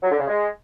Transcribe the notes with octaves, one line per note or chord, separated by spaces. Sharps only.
F#3
D3
C#3
G#3